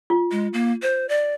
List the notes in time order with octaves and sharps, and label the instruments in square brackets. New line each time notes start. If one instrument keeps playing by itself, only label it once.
[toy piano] F4
[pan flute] G#3
A#3
C5
D5